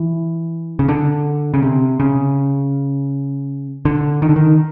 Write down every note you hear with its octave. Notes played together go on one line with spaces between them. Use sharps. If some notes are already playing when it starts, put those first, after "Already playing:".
Already playing: E3
C#3
D3
C#3
C3
C#3
D3
D#3
D3
D#3